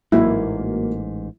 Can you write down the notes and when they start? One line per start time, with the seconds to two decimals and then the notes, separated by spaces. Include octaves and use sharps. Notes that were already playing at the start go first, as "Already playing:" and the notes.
0.12 A1 G#2 F#3 A#3 E4 A#4